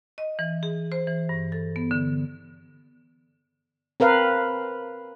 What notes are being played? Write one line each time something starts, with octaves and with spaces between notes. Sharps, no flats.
D#5
E3
G#4
C5
E3
G2
A4
B3
D3
C4 A#4 B4 F5